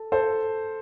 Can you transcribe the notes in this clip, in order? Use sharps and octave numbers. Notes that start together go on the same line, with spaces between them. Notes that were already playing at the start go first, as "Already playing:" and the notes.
Already playing: A4
A4 C5